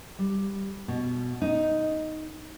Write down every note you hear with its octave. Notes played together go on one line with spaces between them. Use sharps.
G3
B2
D#4